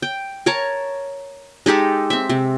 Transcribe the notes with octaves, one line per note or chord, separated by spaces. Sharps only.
G5
A#4 C#5 A5 A#5
G#3 D#4 G4 A4
C4 E5
C3